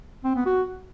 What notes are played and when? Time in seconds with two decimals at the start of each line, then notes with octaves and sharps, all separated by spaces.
0.24 C4
0.35 B3
0.46 F#4